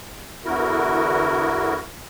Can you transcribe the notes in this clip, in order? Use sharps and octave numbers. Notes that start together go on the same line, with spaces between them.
E2 D3 B3 E4 F#4 A#4